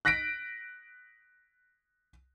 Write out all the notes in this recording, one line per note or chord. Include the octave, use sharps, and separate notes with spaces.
F#6 A#6 B6 D7